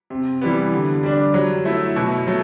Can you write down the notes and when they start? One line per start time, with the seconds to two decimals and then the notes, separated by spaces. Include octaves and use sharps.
0.10 C3
0.41 E3 G3 B3
0.72 D3
1.03 G3 D4
1.34 F#3
1.65 A3 E4
1.96 B2
2.27 F#3 A3